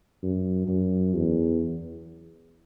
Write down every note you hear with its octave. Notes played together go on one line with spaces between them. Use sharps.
F#2
F#2
E2